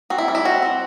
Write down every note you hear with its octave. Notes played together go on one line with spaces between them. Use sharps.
C4 F#4
E4
G3
E4
C4 F#4
C4